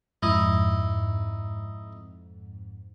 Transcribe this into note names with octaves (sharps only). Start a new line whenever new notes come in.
F2 G#2 D#4 E4 D#5